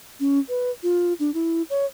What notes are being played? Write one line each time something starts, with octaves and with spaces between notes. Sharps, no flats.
C#4
B4
F4
D4
E4
C#5